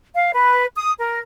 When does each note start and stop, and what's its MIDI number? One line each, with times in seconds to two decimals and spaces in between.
0.14 0.32 77
0.33 0.65 71
0.75 0.91 87
0.97 1.19 70